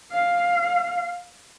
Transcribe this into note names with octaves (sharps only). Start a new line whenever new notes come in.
F5